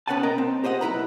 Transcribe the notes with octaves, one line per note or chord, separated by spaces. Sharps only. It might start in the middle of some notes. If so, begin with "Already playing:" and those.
B3 C#4 B4 F#5 G#5 A5
B2 A#4 D#5 G5 A#5
C4
G4 C5 D#5 F5 F#5
B1 E4 B4 A#5